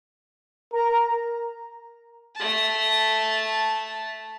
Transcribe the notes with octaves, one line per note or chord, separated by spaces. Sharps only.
A#4 A#5
A3 A5